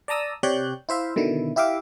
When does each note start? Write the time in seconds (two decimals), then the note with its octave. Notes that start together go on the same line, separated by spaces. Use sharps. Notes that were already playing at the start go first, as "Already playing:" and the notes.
0.08 D5 A5 A#5 D#6 E6
0.43 C3 G4 C#5 D5 F#6 G6
0.89 E4 C5 E5 F5
1.16 B2 D3 D#3 E4
1.56 E4 G4 E5 F5 D6